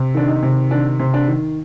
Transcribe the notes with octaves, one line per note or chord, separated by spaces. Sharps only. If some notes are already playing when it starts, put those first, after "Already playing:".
Already playing: C3
D#3 D4
D#4
C3
D#3 D4
C3
D4
D#3